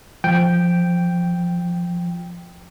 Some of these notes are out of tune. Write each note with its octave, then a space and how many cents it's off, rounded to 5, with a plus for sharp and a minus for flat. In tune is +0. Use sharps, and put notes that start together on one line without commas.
F3 +0 G5 +0